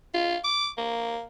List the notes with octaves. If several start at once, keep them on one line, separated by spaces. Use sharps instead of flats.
F4
D6
A#3